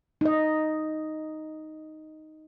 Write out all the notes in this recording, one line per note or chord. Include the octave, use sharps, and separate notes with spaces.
D#4 D#5